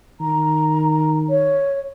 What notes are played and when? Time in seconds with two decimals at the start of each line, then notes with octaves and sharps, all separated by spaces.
0.21 D#3 A#5
1.30 C#5